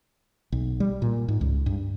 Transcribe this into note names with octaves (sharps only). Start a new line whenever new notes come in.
B1
G3
A#2
G#2
C#2
G2